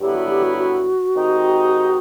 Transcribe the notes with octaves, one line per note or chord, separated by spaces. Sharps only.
G2 D3 F#3 B3 E4 G4
F#4
G4
F#4
F#4
D#3 G#3 C4 D#4 G4